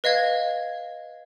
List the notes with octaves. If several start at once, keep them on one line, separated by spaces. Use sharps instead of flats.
B4 D#5 F5 G#6